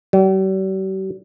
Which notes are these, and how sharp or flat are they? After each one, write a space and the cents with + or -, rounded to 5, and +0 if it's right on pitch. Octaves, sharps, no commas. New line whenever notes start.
G3 -45